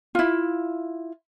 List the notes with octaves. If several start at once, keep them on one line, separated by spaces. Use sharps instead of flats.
E4 F4